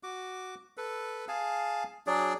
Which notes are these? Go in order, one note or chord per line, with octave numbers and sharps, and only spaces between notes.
F#4 D6
A4 B4
G#4 F5 G#5 A5
F#3 D4 G#4 D5